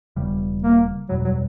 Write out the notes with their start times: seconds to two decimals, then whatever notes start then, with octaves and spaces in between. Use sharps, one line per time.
0.16 E1 E2 C#3 G3
0.63 A#3
1.09 F#1 E2 B2 F#3 G3
1.25 F#3